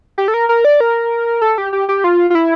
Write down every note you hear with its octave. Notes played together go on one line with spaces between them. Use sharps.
G4
A4
A#4
A#4
D5
A#4
A4
G4
G4
G4
F4
F4
E4